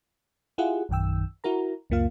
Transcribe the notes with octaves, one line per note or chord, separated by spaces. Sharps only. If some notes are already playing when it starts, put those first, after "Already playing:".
E4 F4 G4 G#4 F#5
A#1 F#2 D#3 G5 E6
E4 F#4 A#4 A#5
C#2 F#2 A#3 F4 F5